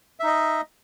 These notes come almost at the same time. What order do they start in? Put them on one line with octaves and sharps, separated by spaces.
E5 D#4 D#5